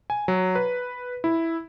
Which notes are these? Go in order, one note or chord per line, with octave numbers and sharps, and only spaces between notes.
G#5
F#3
B4
E4